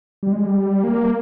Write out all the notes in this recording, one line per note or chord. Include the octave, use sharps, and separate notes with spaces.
G3
G#3
G3
A#3